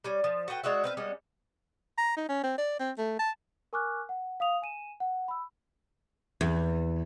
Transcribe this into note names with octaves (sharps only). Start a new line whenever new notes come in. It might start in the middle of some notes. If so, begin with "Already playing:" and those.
G3 C#4
F3
F#4 A4 B4 G5
G#3 D4 F#4 E5
C4 B4 F5
G3 G#3 B3 C#4
A#5
D#4
C#4
C4
D5
C4
A3
A5
A#4 G#5 C#6 D6 F6 F#6
F#5
F5 D#6 F7
G#5 D#7 E7
F#5
B5 E6
E2